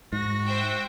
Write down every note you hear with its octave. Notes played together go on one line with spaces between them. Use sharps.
G#2 F#4 A#6
C5 E5 G5